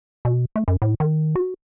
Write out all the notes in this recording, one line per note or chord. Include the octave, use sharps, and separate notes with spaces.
B2
A3
F#2
A2
D#3
F#4